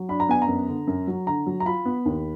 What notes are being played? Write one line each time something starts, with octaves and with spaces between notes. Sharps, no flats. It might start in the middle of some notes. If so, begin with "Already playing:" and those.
Already playing: F#3
D4 B5
A#5
B3 G#5
A#5
F#2
D3
F#2
F#3
D3 A#5
F#3
A#5
F4 B5
B3
D#2